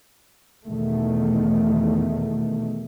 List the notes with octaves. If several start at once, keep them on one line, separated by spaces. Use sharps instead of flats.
E2 B2 D#3 A3